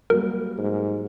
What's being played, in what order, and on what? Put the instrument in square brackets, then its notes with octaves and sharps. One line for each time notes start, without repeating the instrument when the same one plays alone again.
[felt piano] F#3 G3 A#3 [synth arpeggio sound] A#4
[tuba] G#2